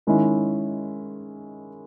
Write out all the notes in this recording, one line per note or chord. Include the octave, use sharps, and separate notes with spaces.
D#3 G#3 C#4 E4